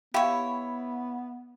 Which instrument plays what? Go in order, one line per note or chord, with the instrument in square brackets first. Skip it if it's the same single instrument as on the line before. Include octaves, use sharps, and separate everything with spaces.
[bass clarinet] B3 [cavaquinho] E4 C#5 [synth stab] G4 [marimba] F5